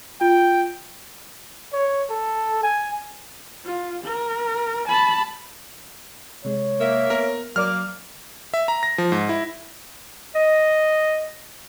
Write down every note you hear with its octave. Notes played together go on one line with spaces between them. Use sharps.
F4 G5
C#5
A4
G#5
F4
A#4
A5 B5
C3 G#3 C#5
A#3 E5
B3 A#4
F#3 A#3 D5 D6 F6
E5
A#5
A#6
F3
G#2
E4
D#5